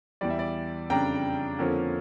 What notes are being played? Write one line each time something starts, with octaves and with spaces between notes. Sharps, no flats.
E2 E3 G3 D5
E5
D5
F2 C#3 G3 D4 G5 A#5
F2 D3 F3 A#3 C#4